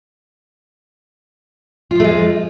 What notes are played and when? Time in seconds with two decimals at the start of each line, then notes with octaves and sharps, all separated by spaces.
1.91 F4
1.95 F3
2.00 A3
2.04 G#3